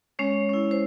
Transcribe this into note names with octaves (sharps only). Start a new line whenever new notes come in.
G#3 C#4 C#5
C#4 E4
C5